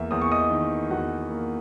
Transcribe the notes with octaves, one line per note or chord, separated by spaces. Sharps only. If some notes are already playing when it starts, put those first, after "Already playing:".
Already playing: E2 A#3 E5
E2 D#6
C#6
D#5 D#6
D#3
E2 F#4 F#5
A#3